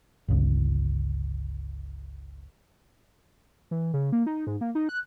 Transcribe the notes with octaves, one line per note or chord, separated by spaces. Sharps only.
G1 C#2
E3
C#3
A#3
D#4
G#2
A#3
D#4
F#6